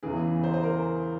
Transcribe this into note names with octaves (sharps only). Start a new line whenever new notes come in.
E2 C#3 E3 G#4
C5
C5
A#4